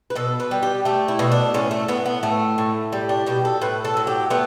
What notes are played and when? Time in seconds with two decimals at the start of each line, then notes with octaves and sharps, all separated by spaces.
0.10 B4
0.15 B2 A4
0.40 B4
0.51 G3
0.63 G4
0.85 A3 G4
1.08 E4
1.19 B2
1.32 D4
1.54 A2 C#4
1.71 A3
1.88 A2 B3
2.06 B3
2.23 A2 A3
2.58 A2
2.92 G3
3.09 D4
3.26 B2 G4
3.45 A4
3.61 A2 B4
3.85 A4
3.97 F#3
4.07 G4
4.30 A3 B3